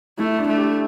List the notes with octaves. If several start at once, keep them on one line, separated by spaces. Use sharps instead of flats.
A3 E4
D4
A3
G4